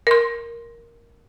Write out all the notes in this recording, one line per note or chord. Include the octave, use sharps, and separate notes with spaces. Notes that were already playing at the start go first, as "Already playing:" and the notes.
A#4 C6